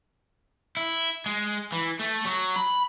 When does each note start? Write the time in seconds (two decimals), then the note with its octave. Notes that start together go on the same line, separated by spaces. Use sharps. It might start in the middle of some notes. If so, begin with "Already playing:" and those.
0.77 E4
1.26 G#3
1.72 E3
1.99 A3
2.25 F#3
2.56 B5